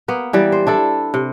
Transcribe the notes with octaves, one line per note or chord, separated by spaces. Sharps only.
A#3 B3
E3 G3 D5
C5
D4 E4 A4
C3